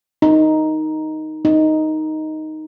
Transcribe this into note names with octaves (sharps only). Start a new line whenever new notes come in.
D#4
D#4